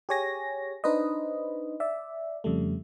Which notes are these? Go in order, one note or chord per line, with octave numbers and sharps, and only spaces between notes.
G4 G#4 C#5 G#5 A#6
D4 D#4 B4 C5 D#5
D5 E5
F2 C#3 G3 A3